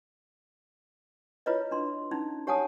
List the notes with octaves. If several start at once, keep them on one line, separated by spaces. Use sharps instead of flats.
E4 F4 B4 C#5 D#5
D4 C6
C#4 D#4 E4
G4 C#5 F#5 G#5 A5 D#6